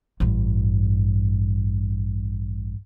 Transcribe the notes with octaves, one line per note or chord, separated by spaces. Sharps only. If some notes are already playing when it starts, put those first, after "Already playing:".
A1 G2